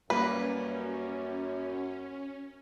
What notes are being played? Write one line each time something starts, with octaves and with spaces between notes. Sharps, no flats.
F#2 G3 A#3 C#4 B4